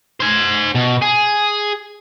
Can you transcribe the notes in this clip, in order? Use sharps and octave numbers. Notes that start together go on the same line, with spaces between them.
C5 G#5
B2
G#4